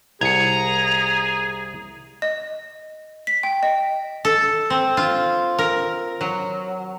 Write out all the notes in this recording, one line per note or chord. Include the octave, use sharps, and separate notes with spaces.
C2 G#4 A#5 G#6 C#7
D#5
B6
G5
D#5
A4
C4
F4
A#4
F#3